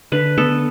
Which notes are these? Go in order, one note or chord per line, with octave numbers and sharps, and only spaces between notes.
D3 B4
B3 A4